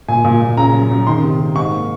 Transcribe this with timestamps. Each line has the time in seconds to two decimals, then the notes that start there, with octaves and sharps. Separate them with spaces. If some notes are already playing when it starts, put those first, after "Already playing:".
0.08 A#2 G#5
0.24 A#2
0.42 A#2
0.57 C#3 A#5
0.74 F#2
0.90 F#2
1.07 D#3 C6
1.23 C3
1.39 C3
1.56 G#2 C#6
1.72 A#3